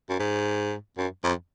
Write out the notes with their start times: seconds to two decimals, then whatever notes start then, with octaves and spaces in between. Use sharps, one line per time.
0.09 F#2
0.19 G#2
0.98 F#2
1.24 F2